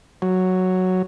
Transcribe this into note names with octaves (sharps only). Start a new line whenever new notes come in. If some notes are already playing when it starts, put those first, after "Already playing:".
F#3